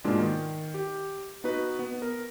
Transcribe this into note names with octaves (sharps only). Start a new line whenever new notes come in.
G#2 B2 G#3 A#3 D4 F4
D#3
G4
B3 D#4 F#4 B4
B3
A#4